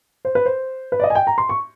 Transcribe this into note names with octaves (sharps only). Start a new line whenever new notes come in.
C5
B4
C5
B4
D5
D#5
G#5
G5
A#5
C6
C#6